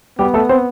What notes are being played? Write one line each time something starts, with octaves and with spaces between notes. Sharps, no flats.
G3 B3 G4
A3 A4
C4 C5